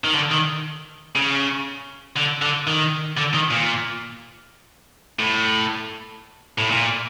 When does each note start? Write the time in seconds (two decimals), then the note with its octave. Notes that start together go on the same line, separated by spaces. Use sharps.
0.04 D#3
0.15 D3
0.31 D#3
1.16 C#3
2.17 D3
2.42 D3
2.67 D#3
3.17 D3
3.34 D#3
3.51 A#2
5.19 A2
6.58 A2
6.70 A#2